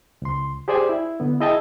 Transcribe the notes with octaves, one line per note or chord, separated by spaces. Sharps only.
C#2 C6
G4 G#4 C5 D5 G5 G#5
E4
D3 B3
E4 G#4 D#5 E5 G5 A5